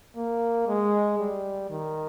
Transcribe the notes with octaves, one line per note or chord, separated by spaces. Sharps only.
A#3
G#3
G3
D#3